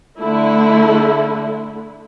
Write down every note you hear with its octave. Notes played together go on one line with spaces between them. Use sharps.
D3 A3 E4